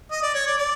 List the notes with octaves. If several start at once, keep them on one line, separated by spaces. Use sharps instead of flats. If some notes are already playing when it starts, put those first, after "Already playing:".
D#5
D5
C#5
D5
D5